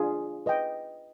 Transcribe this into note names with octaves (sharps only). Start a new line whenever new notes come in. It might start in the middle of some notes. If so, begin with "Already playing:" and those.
Already playing: D4 F4 G#4
B4 D#5 G5